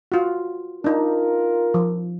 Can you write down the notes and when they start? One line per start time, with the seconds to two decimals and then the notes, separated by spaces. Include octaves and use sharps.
0.12 F4 F#4
0.84 D4 D#4 F4 A#4
1.74 F3